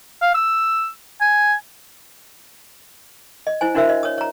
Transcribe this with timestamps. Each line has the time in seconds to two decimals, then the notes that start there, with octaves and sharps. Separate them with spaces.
0.22 F5
0.35 E6
1.21 G#5
3.47 D#5
3.61 E4 C5 G#5
3.75 D4 E4 F#4 A#4 C5 E5
3.89 D#5
4.03 C#5 D#6
4.18 C#5 A#5